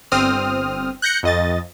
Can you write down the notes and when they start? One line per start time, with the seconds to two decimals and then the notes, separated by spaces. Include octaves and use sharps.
0.12 G1 C4 D#6 F6
1.02 F#6 G6 A#6 C#7
1.23 F2 D#5 A6